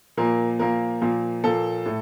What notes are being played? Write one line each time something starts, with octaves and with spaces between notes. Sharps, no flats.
A#2 F3 A#3 A#4
A#2 F3 A#3 A#4
A#2 F3 A#3
A#2 F3 A#3 A4
A2